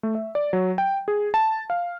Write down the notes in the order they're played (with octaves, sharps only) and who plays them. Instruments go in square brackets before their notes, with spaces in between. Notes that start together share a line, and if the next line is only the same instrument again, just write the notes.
[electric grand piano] A3
E5
D5
F#3
G5
G#4
A5
F5